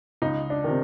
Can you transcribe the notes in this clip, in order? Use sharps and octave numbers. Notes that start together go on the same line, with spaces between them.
C#2 D#4
D4
C3 D#3